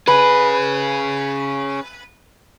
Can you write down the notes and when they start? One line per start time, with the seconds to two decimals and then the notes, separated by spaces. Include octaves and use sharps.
0.08 C#4 G#4 B4